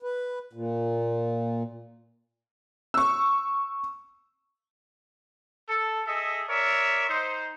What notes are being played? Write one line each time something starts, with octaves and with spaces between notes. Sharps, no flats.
B4
A#2
C#6 E6
A4
G#4 A4 D#5 E5
A#4 C#5 D5 E5
D#4 C5